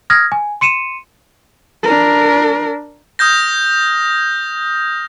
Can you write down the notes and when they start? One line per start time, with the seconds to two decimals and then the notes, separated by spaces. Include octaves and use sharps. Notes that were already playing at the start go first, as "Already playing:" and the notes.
0.10 D#6 F6 G#6 A#6
0.32 G#5
0.61 C6 C#7 D#7 E7
1.83 D4 A#4
3.19 D#6 F6 G6 A#6